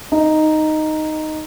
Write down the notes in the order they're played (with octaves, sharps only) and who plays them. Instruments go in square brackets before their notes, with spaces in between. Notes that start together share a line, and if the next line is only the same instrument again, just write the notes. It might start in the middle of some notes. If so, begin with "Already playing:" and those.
[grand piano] D#4